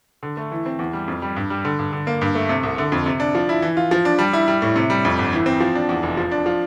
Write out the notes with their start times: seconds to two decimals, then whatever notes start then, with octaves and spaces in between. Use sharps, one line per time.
0.23 D3
0.37 A3
0.51 E3
0.66 C4
0.79 E2
0.93 G3
1.08 F2
1.22 G3
1.36 G2
1.50 G3
1.65 D3
1.79 G2
1.93 D3
2.07 A#3
2.21 G2
2.35 A3
2.49 C3
2.63 C2
2.78 D3
2.92 F2
3.06 C3
3.20 D4
3.35 F3
3.49 E4
3.62 E3
3.77 F4
3.91 F3
4.05 D4
4.19 G3
4.33 E4
4.48 G3
4.62 A2
4.76 C3
4.90 G3
5.05 F2
5.19 G1
5.32 E3
5.46 C4
5.60 F3
5.75 D4
5.89 E2
6.03 F1
6.17 F3
6.32 D4
6.46 F3